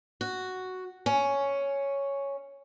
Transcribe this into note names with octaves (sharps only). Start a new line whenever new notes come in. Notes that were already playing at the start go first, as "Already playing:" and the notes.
F#4
C#4